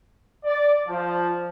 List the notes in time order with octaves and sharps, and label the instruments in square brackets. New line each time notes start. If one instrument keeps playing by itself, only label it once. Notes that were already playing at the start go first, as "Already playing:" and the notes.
[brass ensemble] D5
F3